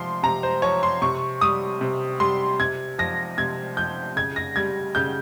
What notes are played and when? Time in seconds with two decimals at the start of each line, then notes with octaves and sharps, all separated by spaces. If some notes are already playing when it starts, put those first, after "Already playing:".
Already playing: C3 F3 C6
0.23 C3 A#5
0.43 C5
0.62 F3 C#5
0.83 C6
1.02 C3 C#6
1.41 G3 D#6
1.81 C3
2.20 G3 C6
2.59 C3 G#6
2.98 F3 A#6
3.38 C3 G#6
3.77 F3 G6
4.16 C#3 G#6
4.36 A#6
4.56 G3 G#6
4.95 C#3 G6